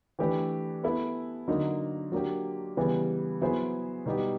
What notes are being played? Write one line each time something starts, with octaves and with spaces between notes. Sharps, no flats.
E3 A3 D4 G4 B4
B3 E4 A4
D3 F#3 A#3 D#4
F#3 A#3 D4 G4
C#3 E3 G3 B3
F#3 B3 E4 G#4 C5
B2 G3 B3 D#4 G4